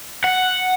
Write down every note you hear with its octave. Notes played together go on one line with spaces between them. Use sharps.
F#5